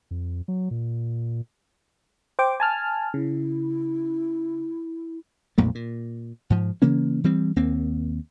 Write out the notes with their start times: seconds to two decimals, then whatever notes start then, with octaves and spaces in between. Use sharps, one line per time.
0.11 F2
0.48 F#3
0.71 A#2
2.39 C5 G5 D6
2.60 G#5 A5 F6
3.14 C#3 E4
5.58 B1 F2 A#2 A3
5.75 A#2
6.50 G#2 F3
6.82 C#3 E3 A#3 C#4
7.24 E3 G3 C4
7.56 D#2 A#3 C4